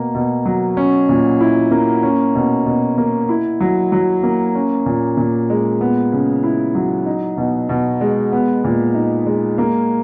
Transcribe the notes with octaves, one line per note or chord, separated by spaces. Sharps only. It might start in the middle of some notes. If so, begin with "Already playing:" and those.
Already playing: B2 A#3
B2
F#3
C#4
A#2
E4
A#3
C#4
B2
B2
A#3
E4
F#3
F#3
A#3
C#4
A#2
A#2
G#3
B3
C#3
E4
F#3
D#4
B2
B2
G#3
B3
A#2
D#4
G#3
A#3